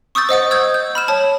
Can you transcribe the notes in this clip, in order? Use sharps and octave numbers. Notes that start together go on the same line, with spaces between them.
C#6 D#6 E6 G6 A6
C5 D#5 F#5 D#6
E6 G6 G#6
G6
B5 F6 E7
C#5 A5